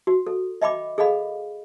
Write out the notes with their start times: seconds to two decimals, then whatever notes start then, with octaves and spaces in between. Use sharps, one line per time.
0.07 F#4
0.27 A4
0.62 D#5 E5 G5 B5 D6
0.98 G#4 A4 D#5 F5 B5